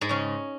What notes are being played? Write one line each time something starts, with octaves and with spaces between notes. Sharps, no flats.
G#2 G#3
C#3 C#4